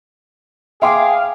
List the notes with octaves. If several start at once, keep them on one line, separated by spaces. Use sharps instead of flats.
G#4 E5 F5 G5 C6 D6